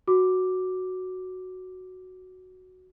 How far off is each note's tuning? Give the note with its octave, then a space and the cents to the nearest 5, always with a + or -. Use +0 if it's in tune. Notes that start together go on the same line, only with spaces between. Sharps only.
F#4 +0 D6 +0